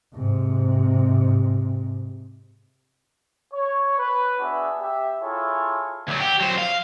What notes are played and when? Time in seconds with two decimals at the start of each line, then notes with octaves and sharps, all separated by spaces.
0.14 G#2 C3
3.53 C#5
3.99 B4
4.40 B3 D4 F#4 G#4 E5
4.81 G4 E5
5.21 E4 F4 G#4 A4 C#5
6.08 D2 F#3
6.20 G4
6.41 F#3 C5
6.58 F5